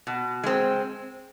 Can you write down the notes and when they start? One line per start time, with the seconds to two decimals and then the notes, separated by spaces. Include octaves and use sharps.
0.07 B2
0.44 G#3 C4